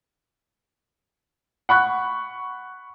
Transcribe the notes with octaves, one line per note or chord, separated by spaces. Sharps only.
F#5 B5 C#6 F#6